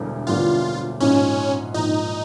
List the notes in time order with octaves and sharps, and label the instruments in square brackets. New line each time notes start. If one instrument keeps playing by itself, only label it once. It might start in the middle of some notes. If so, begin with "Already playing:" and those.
Already playing: [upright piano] E1 D2 D3 G3 B3
[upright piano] E1 D2 D3 G3 B3 [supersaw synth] F4
[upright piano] A#1 G#2 D#3 [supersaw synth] C#4
[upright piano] A#1 G#2 D#3 [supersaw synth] D#4